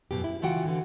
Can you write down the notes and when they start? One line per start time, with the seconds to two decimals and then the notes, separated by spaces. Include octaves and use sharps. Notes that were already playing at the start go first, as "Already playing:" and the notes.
0.11 F#2 B2 G4
0.24 E4
0.42 C#3 E3 F4 F#4 F#5 G5
0.65 D3 E3